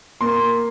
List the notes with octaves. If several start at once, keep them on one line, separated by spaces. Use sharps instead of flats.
A#3 C6